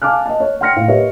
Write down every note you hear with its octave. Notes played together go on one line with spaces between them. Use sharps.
F5 G#5 A5 D6 F6 F#6
D#5 A5
C#5
F#5 G5 C6 F6 A#6 C#7
A2 F5
G4 A#4 B4 C#5 D#5 E5